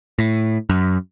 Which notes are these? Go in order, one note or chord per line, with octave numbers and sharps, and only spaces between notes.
A2
F#2